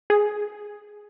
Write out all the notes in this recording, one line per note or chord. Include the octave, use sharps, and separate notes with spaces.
G#4